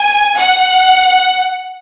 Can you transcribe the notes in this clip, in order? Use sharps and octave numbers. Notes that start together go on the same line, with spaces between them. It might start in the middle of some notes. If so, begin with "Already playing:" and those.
Already playing: G#5
F#5